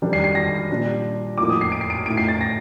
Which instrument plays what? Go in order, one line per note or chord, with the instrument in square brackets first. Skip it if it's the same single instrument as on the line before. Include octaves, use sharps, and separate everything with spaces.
[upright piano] D#3 G3 D4
C7
C7
A#6
A#2 G3 D4
A2 F3 A#3 D#4 D6
D#6
C7
D7
C7
D7
A2 A3 D#4 D7
C7
A6
A#6